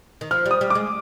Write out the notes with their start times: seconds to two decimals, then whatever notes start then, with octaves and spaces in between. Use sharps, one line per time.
0.21 D#3
0.31 F3 F6
0.46 G3
0.51 D#6
0.61 G3
0.70 G#3 D6